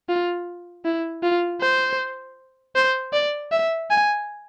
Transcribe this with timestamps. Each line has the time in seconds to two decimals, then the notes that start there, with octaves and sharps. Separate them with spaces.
0.09 F4
0.85 E4
1.23 F4
1.61 C5
2.76 C5
3.14 D5
3.52 E5
3.90 G#5